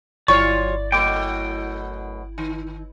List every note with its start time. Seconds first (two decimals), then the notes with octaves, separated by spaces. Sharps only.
0.28 G1 F#3 E4 F4 C#5 D5 C#6
0.92 F#2 B2 A3 G5 D6
2.38 D#3